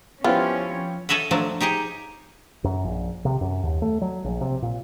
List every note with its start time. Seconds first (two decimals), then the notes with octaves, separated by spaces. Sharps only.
0.24 F3 B3 C#4 E4 F4 G4 C5
1.09 A4 C#5 D#5 E5 F#5
1.31 F3 F#3 A3 D4
1.61 D#4 G4 G#4 D#5
2.64 F#2
2.84 A#1
3.25 C3
3.41 F#2
3.63 D#2
3.82 A3
4.01 F#3
4.24 A#1
4.41 C3
4.62 A#2